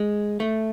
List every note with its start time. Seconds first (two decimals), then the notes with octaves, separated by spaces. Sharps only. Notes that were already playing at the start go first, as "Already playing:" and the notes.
Already playing: G#3
0.40 A3